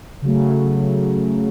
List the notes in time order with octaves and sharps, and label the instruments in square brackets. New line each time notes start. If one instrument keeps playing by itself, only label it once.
[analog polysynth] C#3 F#3 A3